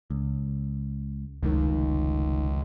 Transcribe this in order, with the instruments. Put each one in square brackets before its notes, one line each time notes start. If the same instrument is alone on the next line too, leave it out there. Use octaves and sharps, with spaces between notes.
[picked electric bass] C#2
[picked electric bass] F1 D#3 [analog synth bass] C#2